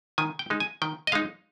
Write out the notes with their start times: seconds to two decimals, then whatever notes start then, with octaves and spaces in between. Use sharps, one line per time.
0.18 D#3 G#5
0.39 G5
0.50 G#3 D#4
0.60 G#5
0.82 D#3 G5
1.07 D#5
1.12 G#3 D#4 F5